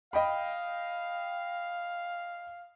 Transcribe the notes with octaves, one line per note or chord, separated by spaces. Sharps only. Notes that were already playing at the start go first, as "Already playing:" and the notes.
D#5 F5 G5 B5